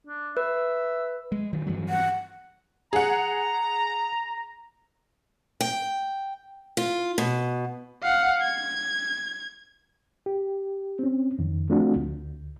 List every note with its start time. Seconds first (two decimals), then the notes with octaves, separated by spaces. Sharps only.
0.07 D4
0.37 B4 E5
1.32 G#3
1.53 D#3 F#3
1.67 G2 E3 F#3
1.89 F#5
2.93 G#4 F#5 A#5
5.61 G5
6.77 F4
7.18 B2
8.03 F5 F#5
8.42 G#6
10.26 G4
10.99 C4 C#4
11.39 F2 D#3
11.69 F3 A3 C4 D4 F4 F#4
11.96 D2